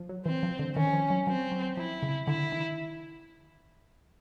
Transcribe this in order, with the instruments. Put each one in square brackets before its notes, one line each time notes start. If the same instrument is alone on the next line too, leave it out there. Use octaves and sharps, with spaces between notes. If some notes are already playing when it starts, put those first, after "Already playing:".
Already playing: [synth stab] F3
F#3
[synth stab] E3 [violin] C4
[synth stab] F3
D3
[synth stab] D#3 [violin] C#4
[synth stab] F3
F#3
[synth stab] F#3 [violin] C4
[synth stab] F#3
[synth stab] F3 [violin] E4
[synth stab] C#3
[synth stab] D3 [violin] E4
[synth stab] D#3